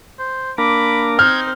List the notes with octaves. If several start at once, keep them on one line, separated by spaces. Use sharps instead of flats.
C5
A#3 D4 A#4 B5 D6
C4 D#4 C5 F6 G6 G#6